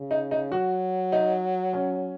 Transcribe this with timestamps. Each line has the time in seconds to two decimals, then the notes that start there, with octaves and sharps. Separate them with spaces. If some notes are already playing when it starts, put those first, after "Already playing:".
Already playing: C#3
0.11 D#4
0.31 D#4
0.52 F#3 F#4
1.12 D#4
1.73 C#4